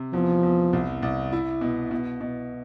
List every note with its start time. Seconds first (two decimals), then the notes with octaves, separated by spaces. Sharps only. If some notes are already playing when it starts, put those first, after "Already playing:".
Already playing: C3
0.13 E2 F3
0.43 E2
0.73 C2
1.03 C2
1.32 E4
1.61 B2
1.91 B2
2.21 B2